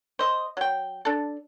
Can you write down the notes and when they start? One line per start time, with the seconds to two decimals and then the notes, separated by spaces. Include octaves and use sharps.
0.19 C5 D#5
0.57 F#3 G5
1.05 D4 A4